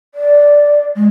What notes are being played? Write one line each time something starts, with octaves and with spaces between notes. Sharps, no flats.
D5
G#3